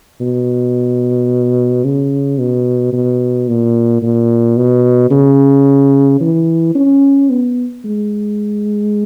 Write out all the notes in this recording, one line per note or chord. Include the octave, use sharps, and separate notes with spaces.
B2
C#3
B2
B2
A#2
A#2
B2
C#3
E3
C#4
B3
G#3